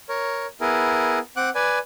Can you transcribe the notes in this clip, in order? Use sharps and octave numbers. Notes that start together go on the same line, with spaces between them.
A#4 C#5
B3 E4 G#4 A#4
C4 F#5 D6 F#6
B4 D5 G#5